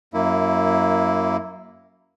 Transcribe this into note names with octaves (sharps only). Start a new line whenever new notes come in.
F#2 A#3 E4